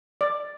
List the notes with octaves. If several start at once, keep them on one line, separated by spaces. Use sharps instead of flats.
D5